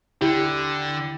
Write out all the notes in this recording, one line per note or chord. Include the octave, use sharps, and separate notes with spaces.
D3 E4 G4